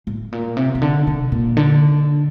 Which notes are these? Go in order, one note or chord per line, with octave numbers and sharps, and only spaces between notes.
A2
A#2
C3
C3
D3
C3
A#2
D3